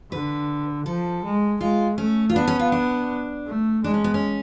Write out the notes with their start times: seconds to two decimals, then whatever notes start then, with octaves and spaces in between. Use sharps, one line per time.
0.12 D3 B4
0.86 F3 A4
1.24 G#3
1.61 G#3 F4
1.98 A3 C#4
2.29 F4
2.35 B3 D4
2.47 C#4
2.59 F4
2.72 D4
3.47 A3
3.84 G#3 D4
3.94 C#4
4.04 B3
4.14 C#4